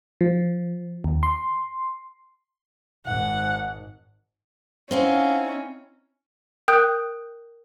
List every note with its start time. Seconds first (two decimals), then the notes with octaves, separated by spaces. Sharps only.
0.21 F3
1.04 D#2
1.23 C6
3.06 G#1 G#2 F#5
4.91 C4 C#4 D#4 E4 C5 F5 F#5
6.68 A#4 G5 D#6 F#6 G6